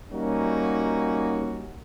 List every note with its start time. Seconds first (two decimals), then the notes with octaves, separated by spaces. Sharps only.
0.12 G3 A#3 C#4 D#4 F#4